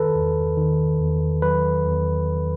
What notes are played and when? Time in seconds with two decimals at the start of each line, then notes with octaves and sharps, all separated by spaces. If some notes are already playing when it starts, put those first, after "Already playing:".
Already playing: D#3 A4 B4
0.15 E2
0.57 D#3
1.00 E2
1.42 F#3 B4
1.85 E2